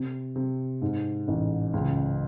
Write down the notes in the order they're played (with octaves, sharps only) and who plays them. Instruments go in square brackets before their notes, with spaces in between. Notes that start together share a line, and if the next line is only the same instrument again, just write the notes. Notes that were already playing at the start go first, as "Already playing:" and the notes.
Already playing: [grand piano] C3
C3
G#2
A1
C#2